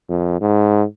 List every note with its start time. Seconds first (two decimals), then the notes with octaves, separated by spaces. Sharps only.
0.09 F2
0.41 G#2